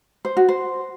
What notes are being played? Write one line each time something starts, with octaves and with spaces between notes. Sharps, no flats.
C5
F#4
C5